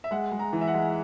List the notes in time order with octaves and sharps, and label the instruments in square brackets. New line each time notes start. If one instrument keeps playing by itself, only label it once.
[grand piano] E5
G#3 F#5
G#3
A#5
E3
E5
F#5
G#3